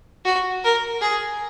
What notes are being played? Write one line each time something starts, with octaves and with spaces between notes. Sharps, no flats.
F#4
A#4
G#4